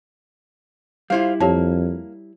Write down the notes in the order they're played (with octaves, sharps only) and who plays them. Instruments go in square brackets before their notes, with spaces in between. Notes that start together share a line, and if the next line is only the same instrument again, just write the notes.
[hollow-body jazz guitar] G3 E4 [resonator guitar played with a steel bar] F4 C5 F5
[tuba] F2 [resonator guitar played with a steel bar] A#3 [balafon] G4 C#5 A5